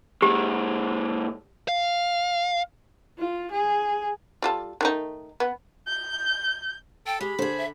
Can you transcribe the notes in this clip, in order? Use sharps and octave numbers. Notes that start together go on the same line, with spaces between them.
A#2 G#3 G4
F5
F4
G#4
G3 F4 A4
D#3 A3 D#4
B3
G6
A4 G5
G#3 G4 B5
D3 G#4 C5
E5